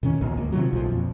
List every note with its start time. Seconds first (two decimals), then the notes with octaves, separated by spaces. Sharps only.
0.03 A2 D#3 C#4
0.21 A#1 D#2 B2
0.37 D2 G#2 A#3
0.52 C3 D#3 F3 F#3
0.73 B1 A#2 F3
0.90 F2 A#2